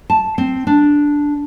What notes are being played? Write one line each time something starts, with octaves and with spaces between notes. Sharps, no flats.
A5
C4
D4